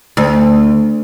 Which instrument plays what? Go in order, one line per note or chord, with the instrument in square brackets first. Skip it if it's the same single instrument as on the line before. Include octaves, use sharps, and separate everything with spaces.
[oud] D2